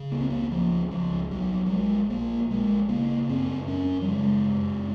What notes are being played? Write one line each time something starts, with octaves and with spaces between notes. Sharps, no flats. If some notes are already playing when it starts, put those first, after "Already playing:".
Already playing: C#3
C#2 A#3
C4
A#3
C#2 F3
C#2 F3
A#1 F#3
F#3
A#1 G#3
A#1 A#3
A#1 G#3
C#3 A#3
F#2 C4
F#2 C#4
F#3
C#3 G#3
F#2